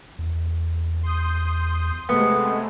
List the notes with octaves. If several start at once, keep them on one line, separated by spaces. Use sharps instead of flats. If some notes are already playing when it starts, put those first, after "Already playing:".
E2
C6 D#6 G6
C3 G#3 A3 B3